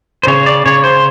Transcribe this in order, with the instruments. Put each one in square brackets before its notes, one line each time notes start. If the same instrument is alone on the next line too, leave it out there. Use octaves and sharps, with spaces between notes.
[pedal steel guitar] C5
C#3 C#5
D5
C#3 C#5
C5